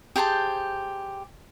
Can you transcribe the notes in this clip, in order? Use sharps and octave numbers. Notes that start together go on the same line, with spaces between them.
G4 G#4 C5 A5